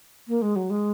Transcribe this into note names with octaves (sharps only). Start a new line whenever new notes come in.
A#3
G#3
F#3
G#3